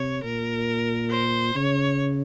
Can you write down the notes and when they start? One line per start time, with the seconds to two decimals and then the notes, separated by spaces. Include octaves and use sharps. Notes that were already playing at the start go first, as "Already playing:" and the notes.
Already playing: C3 C#5
0.24 A#2 A#4
1.11 C5
1.55 C#3 C#5